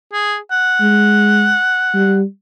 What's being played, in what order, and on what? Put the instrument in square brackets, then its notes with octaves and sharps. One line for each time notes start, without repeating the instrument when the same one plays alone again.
[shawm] G#4
F#5
[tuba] G#3
G3